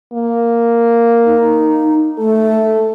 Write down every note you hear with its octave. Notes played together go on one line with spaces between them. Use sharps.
A#3
D#4
A3 A4